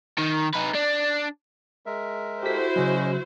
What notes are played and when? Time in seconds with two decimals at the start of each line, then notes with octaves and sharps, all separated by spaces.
0.18 D#3
0.54 D#4 B4
0.75 D4
1.86 G#3 A#4 E5
2.43 E4 F#4 G4 A4 C5 B6
2.76 C#3 F#3 C#4 D#5